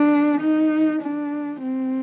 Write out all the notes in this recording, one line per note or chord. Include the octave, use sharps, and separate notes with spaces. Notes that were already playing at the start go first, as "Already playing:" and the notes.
Already playing: D4
D#4
D4
C4